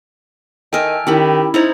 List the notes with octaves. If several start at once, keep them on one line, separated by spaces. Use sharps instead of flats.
D#3 A4 D#5 E5 G5 G#5 F6
D#3 C#4 D#4 E4 G4 B5
D#4 E4 C5 D#5 A#5 G#6